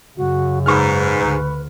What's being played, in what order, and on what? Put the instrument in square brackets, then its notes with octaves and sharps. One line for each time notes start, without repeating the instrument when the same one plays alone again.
[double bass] F#2 C#3 [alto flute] F#4
[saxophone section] G#2 [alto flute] B4 [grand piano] B5 C#6 F6
[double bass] D2